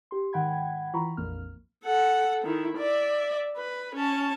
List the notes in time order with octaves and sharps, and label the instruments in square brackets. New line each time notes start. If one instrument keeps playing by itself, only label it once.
[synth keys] G4 C6
G#2 D#3 F#5 G5 B5 G#6
E3 F4 A#5 B5 C#6
A#1 F2 A#3 F6
[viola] A4 F#5
D#3 E4
D5 E5
B4
C#4 A5